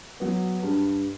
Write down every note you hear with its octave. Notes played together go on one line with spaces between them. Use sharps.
F#3 B3
G2